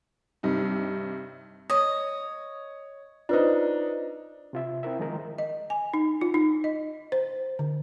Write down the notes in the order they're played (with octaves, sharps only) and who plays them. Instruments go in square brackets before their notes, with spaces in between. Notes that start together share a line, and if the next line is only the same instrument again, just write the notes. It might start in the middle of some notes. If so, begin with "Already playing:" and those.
[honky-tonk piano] G2 C3 D#4
[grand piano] C#5 [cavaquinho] D#5
[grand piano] D4 D#4 [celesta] F4 B4 C5
[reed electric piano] C3 F4 E5
C4 E4 A#4 E5
D#3 F3 G#3 D#4 A#4
[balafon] D#5
G#5
D#4
F4
D#4
D#5
C5
D3